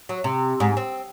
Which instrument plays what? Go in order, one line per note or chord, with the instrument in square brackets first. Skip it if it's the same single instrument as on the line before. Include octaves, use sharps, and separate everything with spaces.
[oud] F#3
C3
G#2
C4